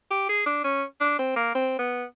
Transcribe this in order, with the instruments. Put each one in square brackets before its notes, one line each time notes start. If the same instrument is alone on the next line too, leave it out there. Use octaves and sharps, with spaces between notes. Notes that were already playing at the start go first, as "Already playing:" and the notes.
[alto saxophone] G4
G#4
D4
C#4
D4
C4
A#3
C4
B3